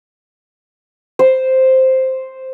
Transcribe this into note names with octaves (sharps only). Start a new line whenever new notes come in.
C5